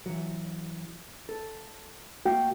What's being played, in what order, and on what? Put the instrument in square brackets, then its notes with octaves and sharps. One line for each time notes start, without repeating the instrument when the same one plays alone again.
[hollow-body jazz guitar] E3 F#3
A4
[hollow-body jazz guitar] A3 A#3 F5 [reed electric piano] F#4 G5